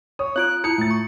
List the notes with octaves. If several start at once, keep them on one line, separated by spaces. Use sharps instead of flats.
C#5 D#6
C4 F4 F#6 D7
E4 F4 D#6 C#7
A2 A6
C#6